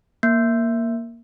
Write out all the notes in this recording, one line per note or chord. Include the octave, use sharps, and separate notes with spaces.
A#3